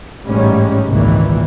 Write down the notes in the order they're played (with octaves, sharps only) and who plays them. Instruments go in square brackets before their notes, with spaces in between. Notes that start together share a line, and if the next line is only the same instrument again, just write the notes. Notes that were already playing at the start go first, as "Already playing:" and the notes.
[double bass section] A1 G#2 G3 G#3 C#4
G#1 C#2 A#2 D#3 E3